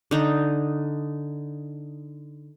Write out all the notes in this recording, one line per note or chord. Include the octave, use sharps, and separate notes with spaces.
D3 D#4